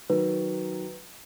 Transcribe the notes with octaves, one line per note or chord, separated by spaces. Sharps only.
D#3 F#3 B4